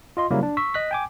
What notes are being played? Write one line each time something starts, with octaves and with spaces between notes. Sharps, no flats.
F4 D#5 C6
C#3 F#3 G3 A#3 E4 A#4
D4
C#6 E6 B6
D#5 F#6 B6
G5 G#5 D6